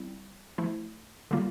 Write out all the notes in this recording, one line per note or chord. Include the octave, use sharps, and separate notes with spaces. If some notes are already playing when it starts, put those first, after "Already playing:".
Already playing: G3 C4 E4
F3 A3 E4
D3 G3 A#3 F4